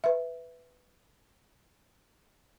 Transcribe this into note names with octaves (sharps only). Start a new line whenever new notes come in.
B4 E5